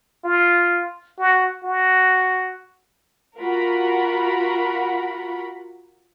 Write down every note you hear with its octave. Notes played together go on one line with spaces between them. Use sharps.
F4
F#4
F#4
F4 F#4 A#4 F#5 B5